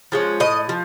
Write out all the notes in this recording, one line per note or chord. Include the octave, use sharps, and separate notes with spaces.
F3 G#3 C#4
A2 D#5
F3